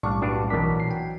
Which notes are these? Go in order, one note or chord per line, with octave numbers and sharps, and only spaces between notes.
B1 A2 G3 D4 F5 C#6
G2 D4 F#4
B1 B2 E3 F#3 D4 A#4 B6
A#2 C7
G5